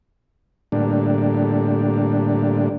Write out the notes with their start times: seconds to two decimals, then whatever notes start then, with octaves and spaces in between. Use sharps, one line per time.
0.72 A2 D3 G3 A#3 D4